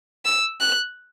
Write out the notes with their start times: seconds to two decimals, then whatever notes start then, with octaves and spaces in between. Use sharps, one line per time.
0.25 E6
0.60 F#6